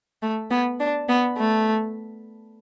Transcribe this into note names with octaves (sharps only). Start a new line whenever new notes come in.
A3
B3
D4
B3
A3